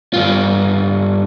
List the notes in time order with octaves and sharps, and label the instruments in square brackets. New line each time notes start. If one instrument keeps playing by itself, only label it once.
[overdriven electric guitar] G2 F4